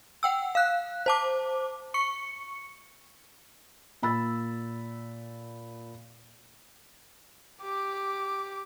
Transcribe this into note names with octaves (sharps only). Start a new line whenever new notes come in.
F#5 G5 E6
F5 F#6
C5 A5 D6
C#6 C#7
A#2 B5 E6 A6
G4 D6